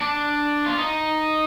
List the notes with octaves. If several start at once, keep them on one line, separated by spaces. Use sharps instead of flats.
D4
F4
D#4